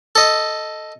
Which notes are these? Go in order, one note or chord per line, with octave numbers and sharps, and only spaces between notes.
A4 D#5